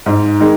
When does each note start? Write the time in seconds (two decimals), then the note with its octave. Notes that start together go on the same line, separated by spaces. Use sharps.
0.06 G#2
0.40 D#3 G#3 D#4